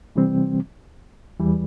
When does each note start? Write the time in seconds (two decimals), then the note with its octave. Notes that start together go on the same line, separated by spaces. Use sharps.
0.16 C3 E3 G3 C4
1.40 E2 E3 G3